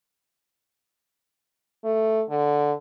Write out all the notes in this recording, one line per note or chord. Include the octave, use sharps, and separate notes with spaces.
A3
D3